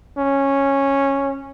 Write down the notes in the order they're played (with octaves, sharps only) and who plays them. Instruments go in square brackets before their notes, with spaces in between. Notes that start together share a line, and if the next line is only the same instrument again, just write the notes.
[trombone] C#4